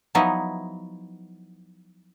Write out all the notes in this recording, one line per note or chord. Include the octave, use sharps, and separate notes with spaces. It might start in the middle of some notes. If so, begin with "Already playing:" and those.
F3 F#3 B3 D#4 E4